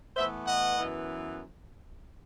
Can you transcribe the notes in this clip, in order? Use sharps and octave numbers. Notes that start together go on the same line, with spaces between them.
A2 E3 B3 C5 E5
D#5 F#5
F#2 E3 B3